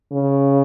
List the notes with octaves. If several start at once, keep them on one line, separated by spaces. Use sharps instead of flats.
C#3